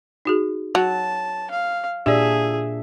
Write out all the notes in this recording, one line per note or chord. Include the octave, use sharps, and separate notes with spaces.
D#4 F#4 G#4
F#3 A5
F5
A#2 D4 G4 G#4 D5 E5